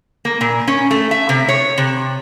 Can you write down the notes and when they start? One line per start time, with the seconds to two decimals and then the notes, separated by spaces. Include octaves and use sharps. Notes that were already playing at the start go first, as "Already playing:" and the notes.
0.25 A#3
0.41 A#2
0.67 C#4
0.91 A3
1.11 E5
1.29 C3
1.48 C#5
1.78 C3